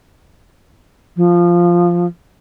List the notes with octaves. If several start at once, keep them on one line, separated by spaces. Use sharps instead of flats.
F3